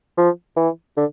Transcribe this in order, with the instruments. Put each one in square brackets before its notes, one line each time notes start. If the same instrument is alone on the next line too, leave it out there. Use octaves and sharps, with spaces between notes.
[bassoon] F3
E3
D3